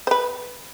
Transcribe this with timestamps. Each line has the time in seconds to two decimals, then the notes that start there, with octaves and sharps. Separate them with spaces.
0.07 C5
0.11 B4